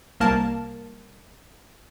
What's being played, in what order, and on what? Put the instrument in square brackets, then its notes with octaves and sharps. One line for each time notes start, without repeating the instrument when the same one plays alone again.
[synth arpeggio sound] C2 A#3 A#4 A5